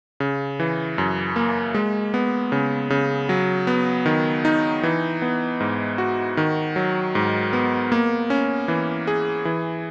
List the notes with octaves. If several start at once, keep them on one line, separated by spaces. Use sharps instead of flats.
C#3
E3
F#2
A#3
G#3
B3
C#3
C#3
F#3
B3
D#3
D#4
E3
B3
G#2
F#4
D#3
F#3
G#2
B3
A#3
C#4
E3
G#4
E3